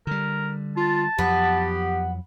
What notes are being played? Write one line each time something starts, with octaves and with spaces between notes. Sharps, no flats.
D3 G3 A#4
F4 A5
F2 F3 F#3 B3 G4